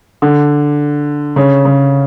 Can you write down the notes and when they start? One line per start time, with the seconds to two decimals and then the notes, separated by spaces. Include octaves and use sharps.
0.22 D3
1.36 C#3
1.65 C#3